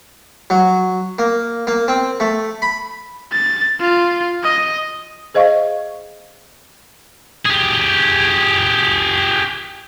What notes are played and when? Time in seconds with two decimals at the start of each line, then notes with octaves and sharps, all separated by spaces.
0.50 F#3
1.19 A#3
1.67 A#3
1.88 C4
2.20 A3
2.62 B5
3.32 A6
3.80 F4
4.43 D#5
5.34 G#4 C5 D#5 F5 C#6
7.45 G4 G#4